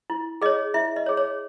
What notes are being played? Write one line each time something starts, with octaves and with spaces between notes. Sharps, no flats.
E4
G#4 C#5 D#5
E4 E5
D#5
C#5
G#4
C#5